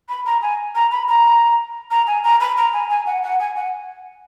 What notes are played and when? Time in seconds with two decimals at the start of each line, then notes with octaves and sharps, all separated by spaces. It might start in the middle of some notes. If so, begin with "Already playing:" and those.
0.09 B5
0.26 A#5
0.42 G#5
0.75 A#5
0.92 B5
1.09 A#5
1.91 A#5
2.07 G#5
2.24 A#5
2.41 B5
2.58 A#5
2.73 G#5
2.90 G#5
3.07 F#5
3.23 F#5
3.40 G#5
3.56 F#5